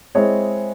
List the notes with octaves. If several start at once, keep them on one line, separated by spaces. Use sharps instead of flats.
G#3 C4 E4 G#4 C#5